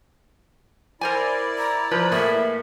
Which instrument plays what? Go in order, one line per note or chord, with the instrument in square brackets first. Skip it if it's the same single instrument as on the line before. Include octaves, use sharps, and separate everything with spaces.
[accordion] E4 D5 [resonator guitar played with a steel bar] A#4 C5 G#5
[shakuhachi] A#5
[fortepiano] F3 [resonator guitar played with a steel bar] B4
[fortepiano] A2 A#3 [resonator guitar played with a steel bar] G#4 B4 [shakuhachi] E5